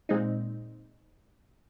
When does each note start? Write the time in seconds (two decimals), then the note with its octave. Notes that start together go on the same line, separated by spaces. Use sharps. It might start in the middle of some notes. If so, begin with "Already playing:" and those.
0.09 A#2 G#3 C4 D#4